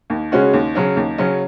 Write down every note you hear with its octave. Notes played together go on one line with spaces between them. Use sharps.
D#2
C#3 G#3 C#4 F#4
D#2
C#3 F#3 C#4
D#2
C#3 F#3 C#4